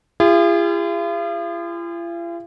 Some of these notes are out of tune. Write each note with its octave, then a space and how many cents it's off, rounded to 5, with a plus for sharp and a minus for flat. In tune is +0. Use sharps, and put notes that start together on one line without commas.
F4 -45 G#4 -45